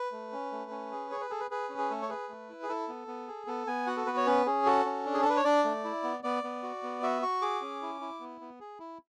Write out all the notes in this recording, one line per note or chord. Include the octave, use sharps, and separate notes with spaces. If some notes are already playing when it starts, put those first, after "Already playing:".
Already playing: B4
A3
C#4
A3
C#4
G#4
G#4 C#5
B4
G#4 A4
B4
G#4 B4
C#4
G#4
A3 A4
C#5
G#4 B4
A3
E4
G#4
E4 A4
B3
B3
G#4
B3 A4
B3 G#5
F#4 F#5
A4
B3 B4
C#5
C#4 B4
C#4 G#4
F#4 A4
C#4
D4
G#4
A4
D4 B4
C#5
D4 D5
A3
E4
B3
B3 D5
B3
F#4
B3
F#4 E5
F#4 C#6
G#4 D6
C#4
E4
E4
B3
B3
G#4
E4